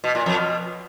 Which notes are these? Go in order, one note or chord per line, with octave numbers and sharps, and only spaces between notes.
B2
A#2
F2
B2